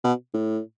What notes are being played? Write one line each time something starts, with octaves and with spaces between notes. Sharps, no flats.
B2
A2